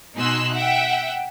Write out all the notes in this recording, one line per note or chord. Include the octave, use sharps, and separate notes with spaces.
B2 D#4 G#5 C6 E6 F#6
E5 F#5 G5